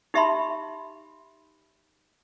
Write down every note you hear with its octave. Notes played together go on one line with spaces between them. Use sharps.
D#4 G4 E5 A5 B5 C6